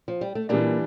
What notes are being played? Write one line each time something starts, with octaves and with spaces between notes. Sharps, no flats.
F3
G3
A3
A#2 E3 G3 A#3 D4